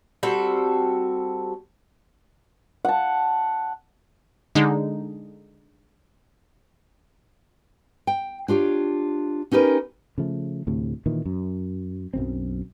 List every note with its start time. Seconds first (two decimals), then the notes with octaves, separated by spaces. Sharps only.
0.23 G3 C4 F#4 A4
2.85 F#5 A5
4.55 D3 G#3 D#4
8.07 G5
8.48 D4 F4 G4 C#5
9.52 C#4 D#4 G4 A#4 B4
10.18 C#3 F3 A3
10.67 D2 A2 C3
11.06 A#2 D#3 E3
11.26 F#2
12.13 B1 F#2 C4